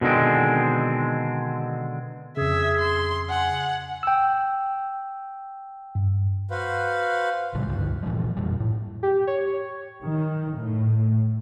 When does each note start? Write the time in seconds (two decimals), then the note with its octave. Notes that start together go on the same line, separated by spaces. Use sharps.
0.01 B2 D3 D#3 G#3 C4
2.37 F2 C#3 G#4 E5
2.79 C6
3.30 F#5 G#5
4.03 G5 E6
5.95 G2
6.51 F#4 B4 C5 F5
7.54 A2 C#3 G3 G#3
7.69 C#2 G2 D3
8.03 A#2 E3 F3 G#3
8.37 F2 B2 G3
8.60 A2
9.03 G4
9.27 C#5
10.04 D#3
10.59 A2